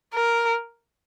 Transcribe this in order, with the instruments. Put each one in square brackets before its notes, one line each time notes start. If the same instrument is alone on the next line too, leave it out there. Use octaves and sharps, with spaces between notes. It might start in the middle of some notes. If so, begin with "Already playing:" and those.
[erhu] A#4